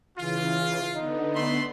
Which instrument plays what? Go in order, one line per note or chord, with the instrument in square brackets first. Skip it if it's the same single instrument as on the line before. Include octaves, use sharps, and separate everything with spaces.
[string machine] C#3 E3 [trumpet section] F4
[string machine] D3 B3 [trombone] D#4
[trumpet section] A3 B5 C6